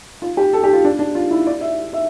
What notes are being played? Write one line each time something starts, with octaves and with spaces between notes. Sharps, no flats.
F4
G4
A4
G4
F4
D4
D4
F4
E4
D5
E5
E5